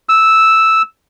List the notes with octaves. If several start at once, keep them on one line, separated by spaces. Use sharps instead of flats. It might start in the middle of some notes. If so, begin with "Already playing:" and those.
E6